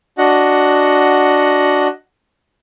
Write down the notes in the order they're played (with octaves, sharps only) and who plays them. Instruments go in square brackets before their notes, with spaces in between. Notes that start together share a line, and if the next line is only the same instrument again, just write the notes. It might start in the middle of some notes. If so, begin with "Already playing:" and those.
[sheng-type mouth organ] D4 F#4 D#5 F#5